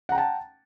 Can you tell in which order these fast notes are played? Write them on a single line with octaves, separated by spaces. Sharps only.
F#5 A#5 G5 A5